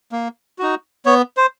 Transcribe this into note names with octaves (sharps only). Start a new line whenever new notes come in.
A#3
D#4 F#4
B3 C#5
C5